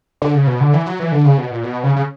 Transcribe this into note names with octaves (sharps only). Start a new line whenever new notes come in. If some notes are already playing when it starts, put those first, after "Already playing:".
D3
C#3
B2
D3
E3
F#3
E3
D3
C#3
B2
A#2
B2
C#3
C#3